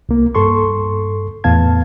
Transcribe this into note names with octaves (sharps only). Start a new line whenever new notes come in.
C2 A#3
G2 A4 C6 C#6
E2 A2 B3 F5 A5 G#6